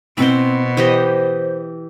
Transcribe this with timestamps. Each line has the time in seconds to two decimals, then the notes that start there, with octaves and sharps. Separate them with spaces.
0.18 B2 C4 E4 C5
0.77 E3 G4 C5 D#5